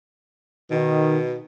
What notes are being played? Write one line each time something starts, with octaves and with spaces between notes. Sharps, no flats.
B2 D#3